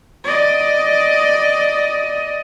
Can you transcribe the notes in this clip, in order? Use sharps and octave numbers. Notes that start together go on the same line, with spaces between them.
D5 D#5